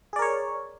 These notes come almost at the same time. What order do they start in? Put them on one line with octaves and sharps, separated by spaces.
G#4 D5 A#4 C#5